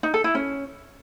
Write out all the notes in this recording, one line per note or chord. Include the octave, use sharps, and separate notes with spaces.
D#4
A4
E4
C#4